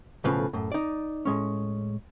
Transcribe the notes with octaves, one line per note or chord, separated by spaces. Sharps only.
B1 A2 C#3 F3 B4
F#2 A2
D#4 D5
A2 G#3 C#4